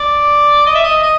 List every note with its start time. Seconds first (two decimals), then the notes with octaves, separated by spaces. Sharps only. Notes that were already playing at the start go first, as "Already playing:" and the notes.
Already playing: D5
0.66 D#5
0.75 E5
0.84 D#5
1.03 D#5